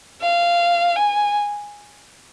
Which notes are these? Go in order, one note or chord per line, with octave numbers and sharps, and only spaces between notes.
F5
G#5